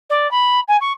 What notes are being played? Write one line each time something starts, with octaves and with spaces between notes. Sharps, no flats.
D5
B5
G#5
C#6